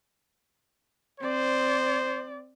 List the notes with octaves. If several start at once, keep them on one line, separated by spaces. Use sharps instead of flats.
C4 C5 D5